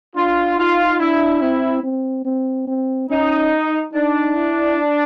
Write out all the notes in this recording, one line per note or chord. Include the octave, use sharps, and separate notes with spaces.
D4 F4
D#4 F4
D4 E4
C4 E4
C4
C4
C4
C#4 D#4
D4 D#4
E4